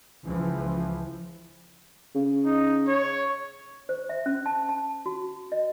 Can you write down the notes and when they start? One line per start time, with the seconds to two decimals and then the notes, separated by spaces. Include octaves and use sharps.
0.25 C#2 E3 F3
2.15 C#3
2.45 D#4
2.88 C#5
3.89 C5
4.09 E5
4.26 C#4
4.46 A5
4.69 A5
5.06 F#4
5.52 D#5